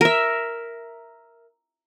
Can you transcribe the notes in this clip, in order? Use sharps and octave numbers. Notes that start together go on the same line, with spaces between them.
A#4 E5